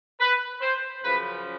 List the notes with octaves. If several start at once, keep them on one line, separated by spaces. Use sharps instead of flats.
B4
C5
F#2 C#3 F3 B4